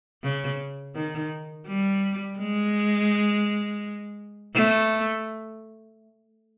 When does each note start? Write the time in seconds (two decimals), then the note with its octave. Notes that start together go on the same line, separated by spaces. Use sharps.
0.23 C#3
0.95 D#3
1.67 G3
2.38 G#3
4.54 A3